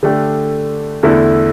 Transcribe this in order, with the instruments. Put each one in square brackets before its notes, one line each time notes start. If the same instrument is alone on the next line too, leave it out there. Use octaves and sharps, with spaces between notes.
[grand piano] D3 A3 D4 G4
E2 D3 A3 E4